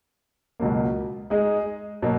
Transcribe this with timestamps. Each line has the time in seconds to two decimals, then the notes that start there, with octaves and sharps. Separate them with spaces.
0.60 C#2 B2 F#3 A#3
1.30 G#3 D#4 G#4 D#5
2.02 B2 F#3 A#3